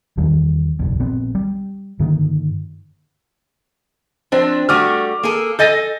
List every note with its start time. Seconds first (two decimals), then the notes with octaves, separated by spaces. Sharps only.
0.17 E2 D#3 E3 G3
0.79 F#1 B1 E2
0.99 A#1 B3 C4
1.35 G3
2.00 G2 D3 D#3 A#3
4.32 F3 C4 D4
4.69 G3 A3 F#4 D6 F6
5.23 A#3 G#4 A4
5.59 A4 D#5 G#5 G6 A6 A#6